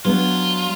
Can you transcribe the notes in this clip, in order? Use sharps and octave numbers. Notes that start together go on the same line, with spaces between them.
F#3 B3 D4 F4